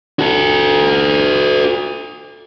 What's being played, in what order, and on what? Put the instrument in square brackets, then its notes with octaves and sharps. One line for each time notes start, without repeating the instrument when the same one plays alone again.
[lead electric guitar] F#4 A4